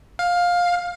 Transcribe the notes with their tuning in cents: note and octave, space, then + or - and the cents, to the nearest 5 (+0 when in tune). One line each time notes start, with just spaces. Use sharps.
F5 +15